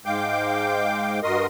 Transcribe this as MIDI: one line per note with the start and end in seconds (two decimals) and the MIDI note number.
0.06 1.20 44
0.06 1.20 56
0.06 1.20 77
0.06 1.20 79
0.06 1.20 86
0.06 1.20 91
1.23 1.46 43
1.23 1.46 66
1.23 1.46 70
1.23 1.46 75
1.23 1.46 84
1.23 1.46 87